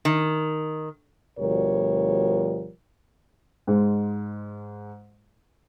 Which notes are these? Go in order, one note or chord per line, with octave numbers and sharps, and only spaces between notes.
D#3
D2 B2 F3 G3 A#4 C#5
G#2 G#3